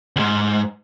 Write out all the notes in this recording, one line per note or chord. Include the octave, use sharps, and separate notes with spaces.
D2 G#2